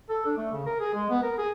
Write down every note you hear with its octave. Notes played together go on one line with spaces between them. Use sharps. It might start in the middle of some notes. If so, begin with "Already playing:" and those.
A4
D4
A3
C#3
A#4
G#4
G#3
B3
A#4
G#4